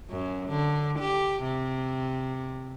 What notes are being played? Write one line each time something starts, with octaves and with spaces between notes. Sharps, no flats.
F#2
D3
G4
C3